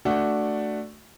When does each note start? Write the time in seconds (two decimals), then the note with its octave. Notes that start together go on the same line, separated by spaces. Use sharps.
0.05 A3 D4 F#4